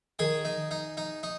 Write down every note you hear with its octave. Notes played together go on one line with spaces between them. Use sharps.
D#3 G#4
D#4
D#4
D#4
D#4